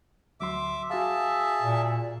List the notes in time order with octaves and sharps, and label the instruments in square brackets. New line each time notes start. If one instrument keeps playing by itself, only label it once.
[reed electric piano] D2 F#3 C6 [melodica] E5 D6
[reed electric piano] F#4 F5 [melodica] G#4 E5 A5
[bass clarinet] A#2